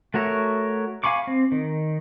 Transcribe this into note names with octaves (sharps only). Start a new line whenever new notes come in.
A3 F#4 A#4 C#5 E5
F5 G#5 B5 C#6 D6
C4
D#3